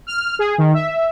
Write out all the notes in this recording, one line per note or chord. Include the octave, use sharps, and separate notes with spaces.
F6
G#4
D#3
E5